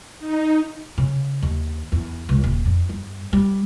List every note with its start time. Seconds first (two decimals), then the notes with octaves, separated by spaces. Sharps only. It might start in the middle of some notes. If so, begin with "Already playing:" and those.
0.19 D#4
0.98 C#3
1.42 D#2
1.92 E2
2.29 C#2
2.44 D#1
2.65 F2
2.89 G2
3.33 G3